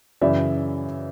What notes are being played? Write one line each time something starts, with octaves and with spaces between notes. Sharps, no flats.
F#2 C#3 E3 D5 E5